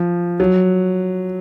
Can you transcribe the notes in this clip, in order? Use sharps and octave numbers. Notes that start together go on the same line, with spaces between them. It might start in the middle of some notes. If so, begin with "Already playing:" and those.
Already playing: F3
F#3